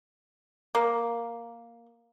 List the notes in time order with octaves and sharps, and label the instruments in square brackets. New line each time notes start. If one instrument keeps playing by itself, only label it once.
[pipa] A#3